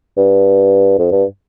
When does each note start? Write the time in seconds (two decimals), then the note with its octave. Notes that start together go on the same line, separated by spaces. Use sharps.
0.17 G2
0.99 F2
1.12 G2